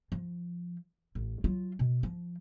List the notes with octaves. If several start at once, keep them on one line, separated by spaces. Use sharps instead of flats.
F3
A1
F#3 F4
B2
F3